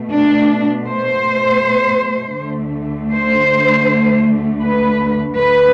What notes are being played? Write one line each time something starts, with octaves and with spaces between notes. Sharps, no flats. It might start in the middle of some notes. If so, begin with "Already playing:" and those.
Already playing: B2 A3
D4
C5
D2 D3 A3
C5
B4
D2 D3 A3 B4